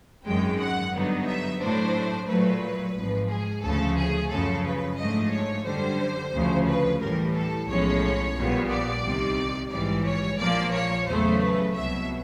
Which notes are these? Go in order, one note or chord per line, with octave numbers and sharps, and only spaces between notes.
G#1 F#2 D#3 G#3 G5
F#5
G2 D3 F#3 B3 D#4
E5
A2 F#3 A3 D4 C5
A#2 F#3 A3 B4
G#1 G#2 F3
G#4
D2 C#3 F3 A3 A4
G#4
F#2 C#3 F3 A4
B4
G#2 F3 A3 D4 D#5
C#5
F#2 D3 G3 C5
D2 C#3 F3
B4
A2 E3 G3 A#4
A4
B1 A2 F3 G#3 C#4 C#5
A#1 A#2 G3 B3
D5
C2 C3 D#3 G3
A#1 G#2 E3 G3 D5
C#5
A#1 A#2 F3 A#3 D5
C#5
E2 C#3 F#3 A3 C5
B4
C2 B2 F#3 E5